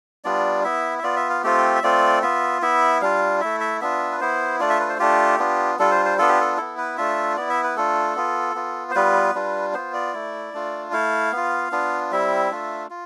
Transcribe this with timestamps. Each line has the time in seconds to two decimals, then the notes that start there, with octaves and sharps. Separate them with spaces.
0.24 G3 B3 D4 F4 D5
0.64 B3 E4 E5
0.99 E5
1.03 B3 F4 D5
1.16 E5
1.30 F5
1.43 A3 C4 F4 G4
1.76 E5
1.83 A3 C4 F4 D5
2.22 B3 F4 E5
2.62 B3 E4 E5
3.01 G3 D4 F4 F5
3.41 A3 E4 E5
3.60 E5
3.81 B3 D4 F4 E5
4.12 B4
4.21 B3 E4 C5
4.60 A3 D4 F4 D5
4.70 E5
4.80 B4
4.89 C5
4.99 A3 D4 F4 G4
5.39 B3 D4 F4
5.79 G3 D4 F4 A4
5.91 C5
6.05 C5
6.18 B3 D4 F4 A4
6.29 G4
6.41 A4
6.57 B3 E4 A4
6.78 B4
6.97 A3 D4 F4 E5
7.37 B3 E4 D5
7.50 E5
7.64 B4
7.76 A3 D4 F4 A4
8.16 B3 F4
8.55 B3 F4
8.91 C5
8.95 G3 B3 F4 B4
9.35 G3 D4 F4
9.74 B3 F4 C5
9.94 D5
10.14 A3 E4
10.54 A3 D4 F4
10.92 A3 E4 F5
11.32 B3 F4
11.72 B3 D4 F4
12.12 G3 C4 E4 E5
12.51 A3 D4 F4
12.90 F4